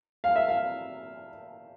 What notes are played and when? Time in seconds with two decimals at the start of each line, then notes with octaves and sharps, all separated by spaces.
0.24 F5
0.36 E5
0.49 F5